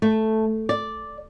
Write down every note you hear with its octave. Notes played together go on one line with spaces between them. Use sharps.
A3
D5